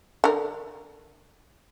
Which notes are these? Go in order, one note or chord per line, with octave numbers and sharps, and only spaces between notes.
D3 A#4